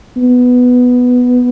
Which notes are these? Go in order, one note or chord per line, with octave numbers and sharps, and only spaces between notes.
B3